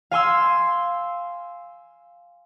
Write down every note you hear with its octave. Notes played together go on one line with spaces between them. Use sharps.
F5 G#5 C6 E6